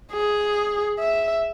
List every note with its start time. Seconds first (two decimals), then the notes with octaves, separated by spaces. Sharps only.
0.12 G#4
0.99 E5